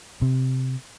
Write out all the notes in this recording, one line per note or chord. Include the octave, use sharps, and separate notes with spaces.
C3